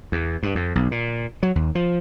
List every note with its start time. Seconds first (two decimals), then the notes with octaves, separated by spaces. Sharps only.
0.12 E2
0.43 G2
0.55 F2
0.75 B1
0.91 A#2
1.43 F#3
1.55 D#2
1.75 F3